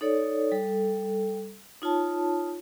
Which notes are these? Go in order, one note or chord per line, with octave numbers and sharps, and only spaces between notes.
D#4 A4 C#5 D5
G3 A4
D#4 F4 C#5 A5